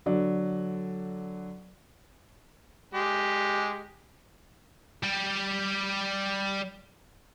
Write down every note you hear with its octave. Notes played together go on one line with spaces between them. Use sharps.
D3 F#3 D5
G#3 G4
G3 G4